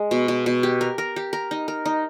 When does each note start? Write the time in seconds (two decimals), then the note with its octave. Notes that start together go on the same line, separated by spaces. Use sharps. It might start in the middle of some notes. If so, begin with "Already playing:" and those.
Already playing: G#3
0.11 B2
0.28 B2
0.46 B2
0.63 G4
0.81 A#4
0.98 A#4
1.16 G4
1.33 A#4
1.51 D#4
1.68 A#4
1.86 D#4